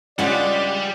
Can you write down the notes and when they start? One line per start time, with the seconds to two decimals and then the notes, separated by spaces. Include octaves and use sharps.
0.19 G2 C#3 G3 G#3 F4 D5 F#5